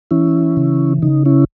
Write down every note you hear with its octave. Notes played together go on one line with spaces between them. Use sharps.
E3 C#4 E4
C#3
C#3 D#4
C#4 E4